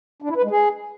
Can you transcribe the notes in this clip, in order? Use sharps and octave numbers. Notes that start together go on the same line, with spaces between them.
D4
E4
B4
G#3
G#4